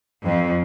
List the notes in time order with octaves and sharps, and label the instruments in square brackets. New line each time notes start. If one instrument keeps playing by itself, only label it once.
[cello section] F2